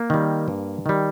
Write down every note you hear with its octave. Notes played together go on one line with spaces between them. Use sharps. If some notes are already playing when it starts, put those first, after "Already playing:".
Already playing: A#3
D#3 G3
G2
D#3 G3